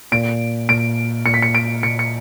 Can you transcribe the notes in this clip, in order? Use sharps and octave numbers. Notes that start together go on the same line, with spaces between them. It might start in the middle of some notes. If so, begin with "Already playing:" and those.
A#2 D7
A#2 D7
A#2 C#7
B6
C#7
D7
A#2 C#7
C#7